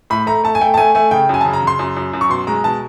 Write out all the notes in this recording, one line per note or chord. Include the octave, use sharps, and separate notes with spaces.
A2 B5
A3 A#5
A3 A5
G#5
A3 G5
A5
A3 G#5
A3 G#5
C#3 G5
F#2 G#5
A5
C#3
A#5
C#3 C6
F#2
F#2
F#2
C#6
B2 C6
G#3 A#5
B2 A5